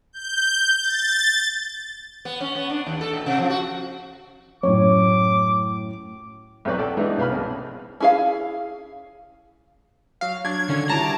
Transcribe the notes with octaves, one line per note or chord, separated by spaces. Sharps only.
G6
A6
B3
C#4
B3
D4
D#2
A4
A#2
C3
F3
F#4
F#2 A2 C#5 D6
B1 E2 C4 B4 D5 C#6
A4 D5 F#5 G5
E3 G#3 B3 D4 D#4
C2 B3 F5 A5 B5 F6
A#1 C4 C#4
C#4 E4 G#4 C5 F5
F#3 F5
F#3 D4 G#6
D3 D#3 C#4 D4
G3 E4 F#4 A5 A#5 D6 A#6